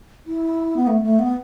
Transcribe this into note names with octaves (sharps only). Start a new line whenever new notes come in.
E4
B3
A3
A3
B3